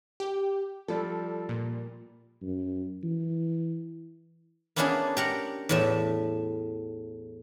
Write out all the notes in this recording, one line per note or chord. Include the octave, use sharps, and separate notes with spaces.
G4
F3 G3 A4
A#2
F#2
E3
A#3 B3 C#4 D4 E4 G#4
G4 A#4 F#5
E2 A2 E5